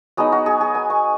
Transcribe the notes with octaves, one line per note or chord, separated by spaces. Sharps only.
F#3 B3 D#4 G#4
F#4
G#4
G#4
G#5
C#6